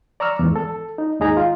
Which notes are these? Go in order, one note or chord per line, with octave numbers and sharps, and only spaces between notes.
D5 A#5 C#6 E6 F6
E2 G#2
A4
D#4
D#2 G#2 D#4 G#4 A#5
F4